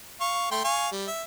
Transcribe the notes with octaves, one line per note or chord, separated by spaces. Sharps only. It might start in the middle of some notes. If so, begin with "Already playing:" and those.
F5 C#6
A3 G5 C6
F5 G#5 C#6
G3
E5